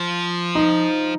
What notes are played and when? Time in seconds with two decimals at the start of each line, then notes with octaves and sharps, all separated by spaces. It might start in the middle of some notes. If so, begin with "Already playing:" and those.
Already playing: F3
0.55 D#4